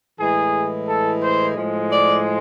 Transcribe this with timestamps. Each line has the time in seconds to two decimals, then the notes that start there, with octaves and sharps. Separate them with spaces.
0.19 A2 E3 G#3 G#4
0.87 A4
1.22 C5
1.56 A2 F3 G#3
1.91 D5